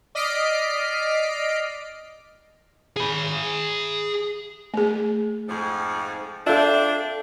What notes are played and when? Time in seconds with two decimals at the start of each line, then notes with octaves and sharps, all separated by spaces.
0.15 D5 D#5 F6 B6 C7 D7
2.96 G#4 B5
4.74 A3 G#4
5.48 F2 G#2 F3
6.47 C4 D4 F4 A4 E5 F5